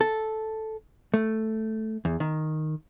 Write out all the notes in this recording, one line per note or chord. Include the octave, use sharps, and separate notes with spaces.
A4
A3
E2
D#3